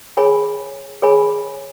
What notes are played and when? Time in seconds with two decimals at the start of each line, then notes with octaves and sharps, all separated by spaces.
0.17 G#4 C#5 G#5 B5
1.02 G#4 C#5 G#5 B5